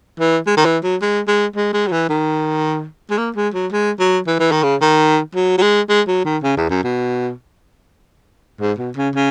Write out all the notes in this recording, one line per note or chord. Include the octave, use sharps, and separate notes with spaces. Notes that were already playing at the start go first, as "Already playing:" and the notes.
E3
G#3
D#3
E3
F#3
G#3
G#3
G#3
G#3
F#3
E3
D#3
G#3
A#3
G#3
F#3
G#3
F#3
E3
E3
D#3
C#3
D#3
F#3
F#3
G#3
G#3
F#3
D#3
C#3
E2
F#2
B2
G#2
B2
C#3
C#3